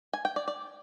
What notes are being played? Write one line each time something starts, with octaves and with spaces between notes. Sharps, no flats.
G#5
G5
D5
D5